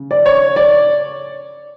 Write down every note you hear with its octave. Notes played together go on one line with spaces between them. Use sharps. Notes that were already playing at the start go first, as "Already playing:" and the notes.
Already playing: C#3
D5
C#5
D5